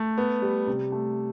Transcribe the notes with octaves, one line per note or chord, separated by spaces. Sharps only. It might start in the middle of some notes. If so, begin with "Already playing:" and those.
Already playing: A3
B3
G3
C3
A3